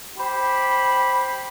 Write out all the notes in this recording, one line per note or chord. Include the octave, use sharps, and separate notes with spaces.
G4 C5 B5